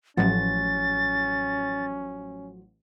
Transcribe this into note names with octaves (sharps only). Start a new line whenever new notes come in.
A1 F3 F#3 C#4 F#5 A6